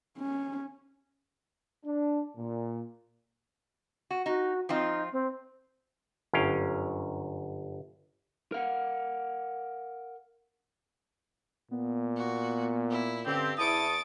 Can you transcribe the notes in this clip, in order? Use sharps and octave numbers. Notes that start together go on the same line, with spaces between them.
C#4
D4
A#2
F#4
D#4 F#4
F3 C4 D#4 F4
C4
G1 F#2 C#4 F5 G5
A#4 F5 F#5
A#2 B3
F#4
E4
G2 D3 C4 C#4 G4
E2 E4 A5 C#6 D#6 A6 D7